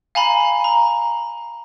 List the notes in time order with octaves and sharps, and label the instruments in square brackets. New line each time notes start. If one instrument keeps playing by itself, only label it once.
[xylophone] F5 G#5 A#5 B5
A#5